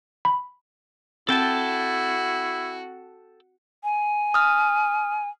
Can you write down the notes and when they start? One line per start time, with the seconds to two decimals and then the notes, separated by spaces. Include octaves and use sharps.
0.25 B5
1.29 C4 E4 F#4 A4 G5 A5
3.84 G#5
4.34 D#6 F6